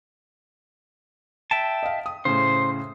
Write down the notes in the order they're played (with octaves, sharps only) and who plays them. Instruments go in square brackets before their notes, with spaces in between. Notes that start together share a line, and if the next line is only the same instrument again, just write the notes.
[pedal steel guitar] E5 G5 A5
[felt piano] D#5 F5
D#6
[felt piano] A2 C#3 [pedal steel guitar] C5